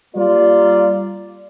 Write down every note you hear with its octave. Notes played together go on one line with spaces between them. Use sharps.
G3 A#3 F4 D5